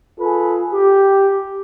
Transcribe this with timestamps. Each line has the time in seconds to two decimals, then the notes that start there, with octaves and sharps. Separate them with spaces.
0.20 F4 G#4 A4 B4
0.73 G4